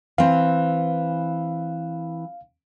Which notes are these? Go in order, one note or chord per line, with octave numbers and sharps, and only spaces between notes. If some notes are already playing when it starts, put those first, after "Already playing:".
E3 C4 F5